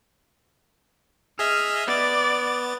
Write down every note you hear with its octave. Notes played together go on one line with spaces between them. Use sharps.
G#4 D#5 E5 F6
B3 D5 A6